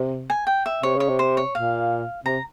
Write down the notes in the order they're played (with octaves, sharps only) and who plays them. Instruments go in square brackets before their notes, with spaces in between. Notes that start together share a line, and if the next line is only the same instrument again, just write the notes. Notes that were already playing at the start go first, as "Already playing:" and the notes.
Already playing: [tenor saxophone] C3
[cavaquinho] G#5
G5
E5
[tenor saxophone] C3 [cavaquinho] C#5
[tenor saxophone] C#3 [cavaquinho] C#5
[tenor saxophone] C3
[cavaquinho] C5
C#5
[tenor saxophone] A#2 [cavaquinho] F5
[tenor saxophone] C3 [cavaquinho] A#5